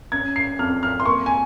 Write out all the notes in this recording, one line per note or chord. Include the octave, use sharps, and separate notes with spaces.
C#4 G#6
C7
F2 F6
F6
C6
A#3 C#6
G#5